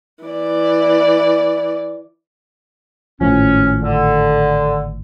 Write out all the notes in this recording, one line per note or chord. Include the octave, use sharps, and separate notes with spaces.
E3 D5
G#1 A2 F3 C#4
D3